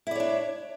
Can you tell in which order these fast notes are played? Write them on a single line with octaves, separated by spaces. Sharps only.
E4 D5 C#5 D4